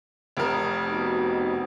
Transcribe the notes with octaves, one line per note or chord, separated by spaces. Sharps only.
F1 F2 A#4
B3 D#4 F#4